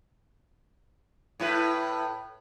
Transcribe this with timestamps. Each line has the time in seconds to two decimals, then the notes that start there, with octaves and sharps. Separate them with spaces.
1.40 A2 E4 B4